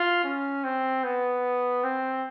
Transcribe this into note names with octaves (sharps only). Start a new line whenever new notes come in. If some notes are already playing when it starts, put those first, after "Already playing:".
Already playing: F4
C#4
C4
B3
C4